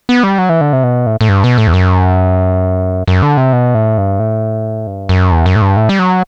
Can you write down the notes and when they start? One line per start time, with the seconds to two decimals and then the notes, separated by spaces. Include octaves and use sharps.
0.09 B3
0.23 G3
0.38 F#3
0.49 E3
0.61 D3
0.73 C3
0.83 B2
1.06 A2
1.21 A2
1.29 G2
1.44 B2
1.58 A2
1.67 E2
1.73 F#2
3.08 F#2
3.22 D3
3.37 C3
3.53 B2
3.75 A2
3.98 G2
4.19 A2
4.87 G2
5.09 F#2
5.32 E2
5.46 F#2
5.56 A2
5.62 G2
5.77 A2
5.89 G3
5.99 F#3